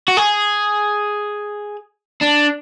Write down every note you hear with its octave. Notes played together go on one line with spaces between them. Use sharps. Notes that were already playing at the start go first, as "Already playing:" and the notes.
F#4
G#4
D4